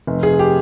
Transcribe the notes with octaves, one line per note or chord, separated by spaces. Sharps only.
F1
G#4
G4